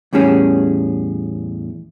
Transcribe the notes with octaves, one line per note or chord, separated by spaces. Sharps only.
E2 A2 G3 C#4 G#4